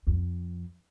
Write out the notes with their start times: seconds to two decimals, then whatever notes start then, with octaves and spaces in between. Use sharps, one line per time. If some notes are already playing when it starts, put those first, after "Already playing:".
0.07 F2